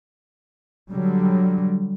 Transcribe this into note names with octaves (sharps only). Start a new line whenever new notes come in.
D3 F#3 G3